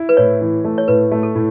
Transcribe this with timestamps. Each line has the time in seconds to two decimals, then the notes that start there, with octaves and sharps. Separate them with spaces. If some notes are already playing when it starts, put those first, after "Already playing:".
Already playing: E4
0.09 B4
0.17 A2 C#5
0.41 E3
0.64 A3
0.78 C#5
0.88 A2 B4
1.12 A3
1.23 A4
1.35 A2